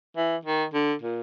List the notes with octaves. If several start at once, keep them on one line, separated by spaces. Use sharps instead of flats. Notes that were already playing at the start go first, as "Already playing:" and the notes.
E3
D#3
D3
A#2